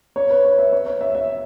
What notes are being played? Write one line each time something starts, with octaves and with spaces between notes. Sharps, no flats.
C#5
B4
C#5
E5
C#5
C#5
E5
E5